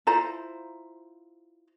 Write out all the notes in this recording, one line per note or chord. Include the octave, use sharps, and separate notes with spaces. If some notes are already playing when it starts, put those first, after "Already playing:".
E4 F4 C5 A#5